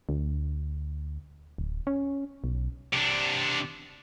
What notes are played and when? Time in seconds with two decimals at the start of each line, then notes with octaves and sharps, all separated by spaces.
0.09 D2
1.58 D1
1.87 C#4
2.44 B1
2.93 C3 D4